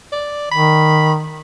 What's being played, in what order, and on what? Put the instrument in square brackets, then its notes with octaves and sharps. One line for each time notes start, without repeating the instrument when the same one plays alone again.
[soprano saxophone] D5
[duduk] D#3 [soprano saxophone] B5